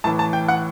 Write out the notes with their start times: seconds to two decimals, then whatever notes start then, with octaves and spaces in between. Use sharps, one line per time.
0.04 A2 E3 A5
0.19 A5
0.33 G5
0.48 F#5